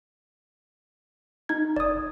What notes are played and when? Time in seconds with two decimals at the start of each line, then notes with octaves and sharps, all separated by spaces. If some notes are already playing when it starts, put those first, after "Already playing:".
1.49 D#4 G#6
1.76 F1 D5 D#6